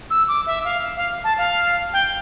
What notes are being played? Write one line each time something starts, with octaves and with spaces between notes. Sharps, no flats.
E6
D6
E5
F5
F5
A5
F5
G5